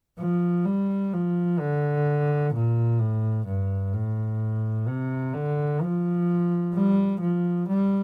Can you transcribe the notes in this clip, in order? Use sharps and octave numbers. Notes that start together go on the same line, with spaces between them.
F3
G3
F3
D3
A#2
A2
G2
A2
C3
D3
F3
G3
F3
G3